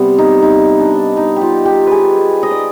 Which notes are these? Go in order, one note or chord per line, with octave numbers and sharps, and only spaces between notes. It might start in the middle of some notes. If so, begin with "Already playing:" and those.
Already playing: C3 G3 B3
D#4
D#4
D4
D#4
G4
F4
G4
G#4 B4
D#5
D5